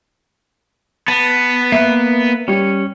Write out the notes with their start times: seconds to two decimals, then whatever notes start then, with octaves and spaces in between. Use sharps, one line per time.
1.08 B3 A5
1.72 A#3 B4 E5
2.48 G3 C#4 C#5